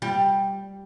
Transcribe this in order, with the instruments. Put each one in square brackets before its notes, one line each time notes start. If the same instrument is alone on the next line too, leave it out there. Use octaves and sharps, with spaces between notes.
[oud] G3